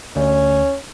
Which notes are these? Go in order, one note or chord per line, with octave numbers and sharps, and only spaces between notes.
D2 C#4